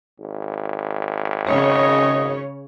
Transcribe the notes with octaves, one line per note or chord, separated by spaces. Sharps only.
G#1
C#3 C#4 C#5 D#5